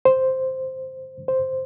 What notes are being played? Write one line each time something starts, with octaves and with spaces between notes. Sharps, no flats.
C5
C5